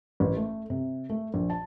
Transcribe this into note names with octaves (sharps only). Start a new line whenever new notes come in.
A1
A3
C3
A3
A#1
A5